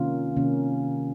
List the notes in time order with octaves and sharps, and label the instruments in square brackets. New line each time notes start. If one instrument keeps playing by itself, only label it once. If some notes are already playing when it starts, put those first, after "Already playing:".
Already playing: [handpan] C3 D#3 A#3 C#4 F4
C3 D#3 A#3 C#4